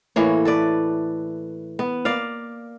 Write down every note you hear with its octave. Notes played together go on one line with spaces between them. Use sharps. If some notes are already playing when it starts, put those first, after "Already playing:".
A2 E3 A#3 C#5
A4 B4 D5
B3
A#3 D5 F5